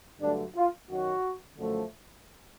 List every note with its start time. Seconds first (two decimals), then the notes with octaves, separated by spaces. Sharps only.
0.20 G2 D3 F#3 A3 D4
0.55 F4
0.89 F#2 D#3 F#3 F#4
1.58 F#2 D3 F3 A3